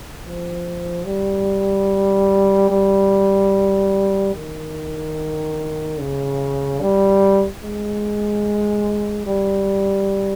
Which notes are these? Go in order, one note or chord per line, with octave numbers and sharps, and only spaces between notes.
F3
G3
G3
D#3
C#3
G3
G#3
G3